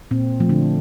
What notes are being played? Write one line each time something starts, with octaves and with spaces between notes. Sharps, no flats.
A#2 C4
F3 A3
D3 D4